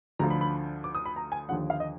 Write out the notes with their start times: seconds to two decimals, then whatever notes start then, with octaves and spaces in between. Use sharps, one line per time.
0.19 D2 D3 F3 A#5
0.30 B5
0.41 B5
0.84 D6
0.95 D#6
1.06 B5
1.16 A#5
1.32 G#5
1.49 D#2 D3 F3 F#5
1.70 F5
1.80 D#5